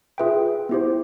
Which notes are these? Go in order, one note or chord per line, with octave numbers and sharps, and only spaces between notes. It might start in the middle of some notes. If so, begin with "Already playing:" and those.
F4 G#4 B4 E5 G5
B3 E4 G4 C5